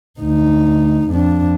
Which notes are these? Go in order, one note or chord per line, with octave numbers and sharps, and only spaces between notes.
D2 D#4
F2 D4